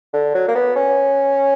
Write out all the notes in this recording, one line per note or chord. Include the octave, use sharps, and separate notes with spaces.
D3
F#3
A#3
B3
C#4